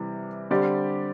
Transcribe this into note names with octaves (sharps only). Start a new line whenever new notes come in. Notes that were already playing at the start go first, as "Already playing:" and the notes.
Already playing: C3 E3 G3
D3 G3 C4 G4 D5